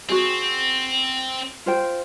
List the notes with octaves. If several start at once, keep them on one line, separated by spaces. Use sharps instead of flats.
C4 F#4 G#4
F4 C5 G5